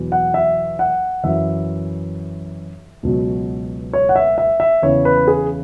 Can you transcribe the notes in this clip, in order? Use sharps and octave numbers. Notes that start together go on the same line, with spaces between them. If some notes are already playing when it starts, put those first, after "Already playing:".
Already playing: E2 B2 F#3
F#5
E5
F#5
F#2 E3 E5
C#2 B2 F#3
C#5
F#5
E5
E5
E5
E2 C#3 E3 C#5
B4
G#4